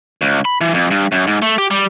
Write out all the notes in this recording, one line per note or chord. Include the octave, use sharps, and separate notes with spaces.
C#2
B5
E3
F2
G2
F#2
G#2
A3
G4
G3